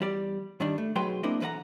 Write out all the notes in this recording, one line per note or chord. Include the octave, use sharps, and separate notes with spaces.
E2 G3 D5
G2 D#3 G3 D4
A3
B1 F#3 G#4 B4 G5 C6
A#3 C4 D4 E4 A#4 D#5
B1 E3 B4 D5 F#5 A#5